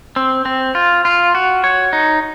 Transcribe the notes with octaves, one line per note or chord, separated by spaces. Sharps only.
C4
C4
F4
F4
F#4
C#5
D#4